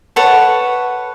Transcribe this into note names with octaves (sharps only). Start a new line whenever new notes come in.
A4 B4 C#5 F#5